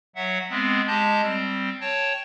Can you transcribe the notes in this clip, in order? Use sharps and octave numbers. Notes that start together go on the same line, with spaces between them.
F#3 E5 F#5
G#3 B3 C4
G#3 G4 D#5 A5 G6
G3 C4
C#5 G5 A5